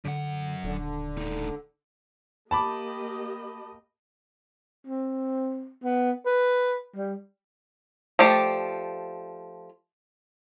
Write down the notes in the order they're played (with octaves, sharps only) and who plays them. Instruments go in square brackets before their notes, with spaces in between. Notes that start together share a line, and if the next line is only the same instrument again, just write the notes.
[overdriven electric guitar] F#2 F#5 [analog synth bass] D3
[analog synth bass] D#1 [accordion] D3
[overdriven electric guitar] A2 D#4
[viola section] A#3 G4 D#5 [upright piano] A5 B5 D6
[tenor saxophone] C4
B3
B4
G3
[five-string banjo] F3 A3 G4 D5